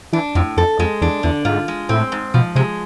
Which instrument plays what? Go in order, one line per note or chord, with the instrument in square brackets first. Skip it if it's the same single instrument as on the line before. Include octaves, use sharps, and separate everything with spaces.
[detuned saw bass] E3 [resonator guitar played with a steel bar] D4
[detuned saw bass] F2 [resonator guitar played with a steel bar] A2
[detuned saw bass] F2 [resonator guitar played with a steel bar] A4
[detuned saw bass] F2 [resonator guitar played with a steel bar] G#3
[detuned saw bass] E2 [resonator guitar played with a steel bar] D4
[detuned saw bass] E2 [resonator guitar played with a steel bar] D3
[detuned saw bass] G#2 [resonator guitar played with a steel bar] F4
[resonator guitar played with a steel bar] G#3
[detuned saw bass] A2 [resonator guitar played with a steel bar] C4
[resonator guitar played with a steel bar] G#2
[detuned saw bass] B2 [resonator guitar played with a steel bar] F3
[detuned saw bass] C3 [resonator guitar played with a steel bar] G#3